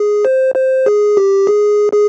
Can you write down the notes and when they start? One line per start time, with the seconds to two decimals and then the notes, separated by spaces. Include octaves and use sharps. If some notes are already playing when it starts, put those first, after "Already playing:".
Already playing: G#4
0.25 C5
0.55 C5
0.86 G#4
1.17 G4
1.47 G#4
1.93 G#4